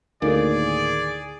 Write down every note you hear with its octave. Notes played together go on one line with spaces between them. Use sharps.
D2 A2 D#3 A#3 G#4 D5